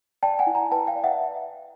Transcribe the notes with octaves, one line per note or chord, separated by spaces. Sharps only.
D5 G5 A5
F#5 G#5
E4
G#5 A#5
B4 G5 A5
F5 G5
D5
E5 F#5